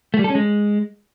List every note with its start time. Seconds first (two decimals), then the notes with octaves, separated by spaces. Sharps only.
0.14 A3
0.19 G3
0.24 A4
0.30 C#4
0.35 G#3